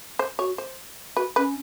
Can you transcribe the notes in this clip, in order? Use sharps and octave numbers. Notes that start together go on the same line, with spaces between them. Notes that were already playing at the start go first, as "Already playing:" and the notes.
C5
F#4 C#5
C5
F#4 B4
C#4 B4